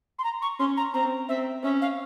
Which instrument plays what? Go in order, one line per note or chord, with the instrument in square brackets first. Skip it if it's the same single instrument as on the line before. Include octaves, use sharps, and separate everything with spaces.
[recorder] C6
A#5
C#6
[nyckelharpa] C#4 [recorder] C6
[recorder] A#5
[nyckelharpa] C4 [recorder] A#5
[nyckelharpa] C4 [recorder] E5
[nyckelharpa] C#4 [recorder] E5
[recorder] F5